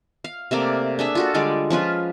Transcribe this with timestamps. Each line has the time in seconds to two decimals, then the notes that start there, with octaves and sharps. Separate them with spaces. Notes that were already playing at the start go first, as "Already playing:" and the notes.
0.24 F5
0.51 C3 A3 A#3 D5
0.99 D4 G#4 E5
1.15 F4 F#4 A4
1.34 D3 G3 G#3 D5
1.70 F3 C#4 F4 B4